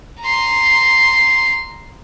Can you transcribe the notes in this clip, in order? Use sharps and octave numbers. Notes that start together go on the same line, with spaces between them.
A#5 C6